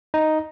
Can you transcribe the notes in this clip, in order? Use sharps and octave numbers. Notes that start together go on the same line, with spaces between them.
D#4